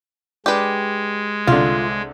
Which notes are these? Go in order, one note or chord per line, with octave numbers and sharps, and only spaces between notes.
G#3 D4 G4 B4
C2 D3 F4